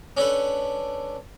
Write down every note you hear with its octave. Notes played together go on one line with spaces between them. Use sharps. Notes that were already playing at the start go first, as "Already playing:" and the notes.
C#4 D4 A4 B4